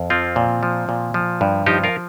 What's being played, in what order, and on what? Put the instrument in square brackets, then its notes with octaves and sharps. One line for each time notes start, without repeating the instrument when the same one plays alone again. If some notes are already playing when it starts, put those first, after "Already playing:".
Already playing: [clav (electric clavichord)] F2
F3 C4 F4
A#2
F3
A#2
F3
G2
F3 D#4 G4
F4 A#4